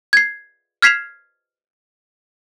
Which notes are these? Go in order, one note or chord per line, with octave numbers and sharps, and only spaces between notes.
G#6 C7
F6 G#6 B6 C7 E7 F7